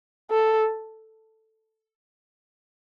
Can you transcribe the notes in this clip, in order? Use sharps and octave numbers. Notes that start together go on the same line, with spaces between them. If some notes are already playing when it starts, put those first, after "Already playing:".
A4